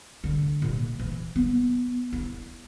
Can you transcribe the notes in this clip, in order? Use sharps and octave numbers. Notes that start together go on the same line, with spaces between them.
D3 A3
A#2 F4
E3
B3
E4